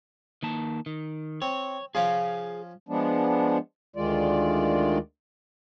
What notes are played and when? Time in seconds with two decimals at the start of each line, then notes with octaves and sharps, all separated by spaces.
0.43 D#3 A#3 A5
0.86 D#3
1.42 C4 C#5
1.95 F3 C#4 F4 G#4 F5
2.88 F3 G#3 B3 D4
3.96 D2 D#3 G#3 F4 D5